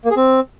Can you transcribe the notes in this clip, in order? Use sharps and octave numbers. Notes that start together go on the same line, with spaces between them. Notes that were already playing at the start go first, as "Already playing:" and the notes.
A#3
G#4
C4